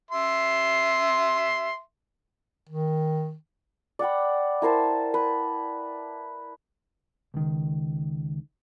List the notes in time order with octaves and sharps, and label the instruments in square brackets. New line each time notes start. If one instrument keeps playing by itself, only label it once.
[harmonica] E5 C6
[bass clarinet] D#3
[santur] D5 F#5 G5 B5
E4 A#4 C5 A5
B4
[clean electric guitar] C#2 D#3